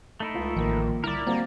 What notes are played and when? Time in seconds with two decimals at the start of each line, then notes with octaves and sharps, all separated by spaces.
0.20 A3 D#4 E4
0.35 C#2 F4
0.56 A1 D#3 F3 A#3
1.04 C2 D3 E4 A#4 D5
1.27 G3 A#3 C4 F#4